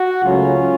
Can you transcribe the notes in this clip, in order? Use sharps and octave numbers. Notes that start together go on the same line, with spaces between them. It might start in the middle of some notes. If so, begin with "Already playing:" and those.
Already playing: F#4
C#2 C#3 F#3 A3 C#4 F4